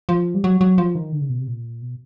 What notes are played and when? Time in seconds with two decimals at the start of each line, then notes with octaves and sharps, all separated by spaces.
0.09 F3
0.34 G3
0.44 F#3
0.61 F#3
0.78 F3
0.95 D#3
1.12 D3
1.21 C#3
1.29 B2
1.39 C3
1.47 A#2
1.82 B2